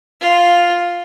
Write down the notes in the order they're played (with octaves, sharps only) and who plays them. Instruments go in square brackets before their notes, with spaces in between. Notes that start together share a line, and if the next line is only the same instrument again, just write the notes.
[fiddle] F4